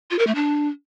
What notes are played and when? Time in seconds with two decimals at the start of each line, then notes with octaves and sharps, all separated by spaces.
0.11 F4
0.19 A#4
0.27 A3
0.35 D4